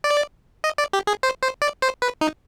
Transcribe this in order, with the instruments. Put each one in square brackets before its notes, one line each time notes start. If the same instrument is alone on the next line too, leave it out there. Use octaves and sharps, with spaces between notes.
[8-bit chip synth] D5
D#5
D5
G4
G#4
C5
C5
D5
C5
B4
D#4